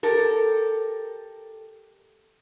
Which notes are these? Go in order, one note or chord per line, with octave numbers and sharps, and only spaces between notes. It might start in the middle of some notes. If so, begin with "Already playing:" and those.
G4 A4 A#4